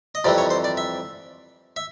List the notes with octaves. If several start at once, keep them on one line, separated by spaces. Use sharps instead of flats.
D#5
F2 C3 E3 G3 D5
C#5
C5
D5
E5
E5